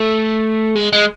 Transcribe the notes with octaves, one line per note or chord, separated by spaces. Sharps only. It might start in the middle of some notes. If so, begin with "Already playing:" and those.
Already playing: A3
G#3
G#3